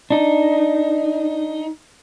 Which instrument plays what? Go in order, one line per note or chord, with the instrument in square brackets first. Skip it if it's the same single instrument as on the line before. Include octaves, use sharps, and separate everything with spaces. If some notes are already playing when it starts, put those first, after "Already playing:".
[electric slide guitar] D4 D#4